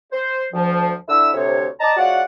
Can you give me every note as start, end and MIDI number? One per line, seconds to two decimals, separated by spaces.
0.12 0.44 72
0.53 0.93 38
0.53 0.93 53
1.08 1.33 50
1.08 1.33 64
1.08 1.33 88
1.34 1.66 38
1.34 1.66 48
1.34 1.66 73
1.80 1.91 74
1.80 1.91 75
1.80 1.91 81
1.80 1.91 82
1.97 2.22 56
1.97 2.22 65
1.97 2.22 66
1.97 2.22 73
1.97 2.22 74
1.97 2.22 78